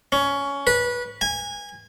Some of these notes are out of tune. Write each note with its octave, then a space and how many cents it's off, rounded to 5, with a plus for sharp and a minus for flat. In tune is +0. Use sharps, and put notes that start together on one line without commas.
C#4 +15
B4 -20
G#5 -25